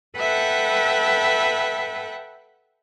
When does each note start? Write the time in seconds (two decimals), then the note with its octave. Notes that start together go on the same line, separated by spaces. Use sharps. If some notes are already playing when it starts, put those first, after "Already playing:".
0.18 A4 B4 E5 F#5 G5